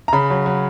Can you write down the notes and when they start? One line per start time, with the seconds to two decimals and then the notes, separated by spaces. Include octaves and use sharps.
0.08 A#5
0.13 C#3 B5
0.30 F#3
0.46 F#3